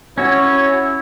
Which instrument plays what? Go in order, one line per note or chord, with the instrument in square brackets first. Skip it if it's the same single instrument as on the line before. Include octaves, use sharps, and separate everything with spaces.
[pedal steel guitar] C#4 F#4 [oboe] E4 [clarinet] C#5